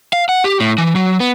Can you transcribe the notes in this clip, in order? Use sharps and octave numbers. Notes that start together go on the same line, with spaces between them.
F5
F#5
G4
A2
E3
F#3
B3